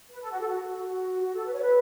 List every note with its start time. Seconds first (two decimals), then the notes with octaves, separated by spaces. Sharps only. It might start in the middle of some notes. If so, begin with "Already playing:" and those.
0.12 B4
0.21 A4
0.30 F#4
0.40 A4
0.48 F#4
0.85 F#4
1.22 F#4
1.34 A4
1.47 B4
1.53 C#5
1.62 B4